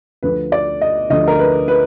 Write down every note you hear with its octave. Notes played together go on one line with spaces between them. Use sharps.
D2 D3 F3 B4
D5
D#5
D2 D3 F3 D#5
A#4
B4
B4